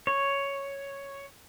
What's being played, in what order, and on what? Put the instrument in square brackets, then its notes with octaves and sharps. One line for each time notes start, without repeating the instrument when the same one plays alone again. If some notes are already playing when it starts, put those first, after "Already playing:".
[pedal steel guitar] C#5